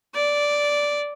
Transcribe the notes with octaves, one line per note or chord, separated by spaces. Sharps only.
D5